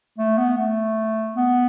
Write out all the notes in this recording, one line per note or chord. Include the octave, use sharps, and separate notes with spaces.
A3
B3
A3
B3